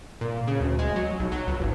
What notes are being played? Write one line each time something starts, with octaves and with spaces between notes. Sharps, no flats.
A#2
C#3
D2
G#3
F#3
B1
F#3
C#2
G#1